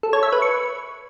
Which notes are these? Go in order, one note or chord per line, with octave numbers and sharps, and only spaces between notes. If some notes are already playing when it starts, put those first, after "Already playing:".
A4
C#5
E5
B4
C#6